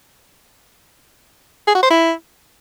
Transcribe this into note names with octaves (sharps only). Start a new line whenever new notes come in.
G#4
F#4
C5
E4